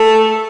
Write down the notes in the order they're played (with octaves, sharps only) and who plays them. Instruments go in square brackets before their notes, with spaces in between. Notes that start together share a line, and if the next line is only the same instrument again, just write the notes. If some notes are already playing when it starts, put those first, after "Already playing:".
Already playing: [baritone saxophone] A3 [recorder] A4